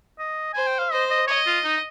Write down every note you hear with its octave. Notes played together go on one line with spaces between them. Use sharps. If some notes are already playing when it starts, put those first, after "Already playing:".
D#5
C5 G#5
G5
F5
C5 D#5
D#5
C#5 D#5
F4
D#4